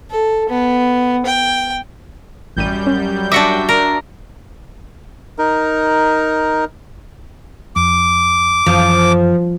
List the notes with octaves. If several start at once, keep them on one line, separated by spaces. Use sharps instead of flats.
A4
B3
G5
A1 F#2 G3 G6 D#7
C#4
D4 F#4 E5 D6 A#6 C#7
D4 A#4
D#4 A#4
F2 D6
F#2 E3 F3